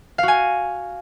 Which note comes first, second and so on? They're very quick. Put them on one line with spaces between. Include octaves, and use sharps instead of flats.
F5 F#4 G#5